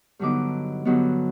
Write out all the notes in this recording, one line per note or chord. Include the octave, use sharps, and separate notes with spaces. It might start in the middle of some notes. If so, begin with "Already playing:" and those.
G2 D3 F#3 B3 D#4 D6
G2 D3 F#3 B3 D#4